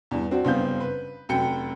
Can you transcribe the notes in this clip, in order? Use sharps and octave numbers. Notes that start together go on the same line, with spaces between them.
E2 G2
C4 D4 F#4
F#1 G2 B3 C4 F5 G6
B4
F1 F#2 G5 C#7